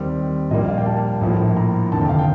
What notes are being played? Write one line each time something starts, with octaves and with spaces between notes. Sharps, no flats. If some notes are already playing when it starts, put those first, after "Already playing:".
Already playing: D#2 D#3 G3 C4
A#1 A#2 G3 A#3 D#5
F5
G5
A5
A#1 A2 F3 A#3
A#5
F1 D#2 D3 A5
G5
F5
G5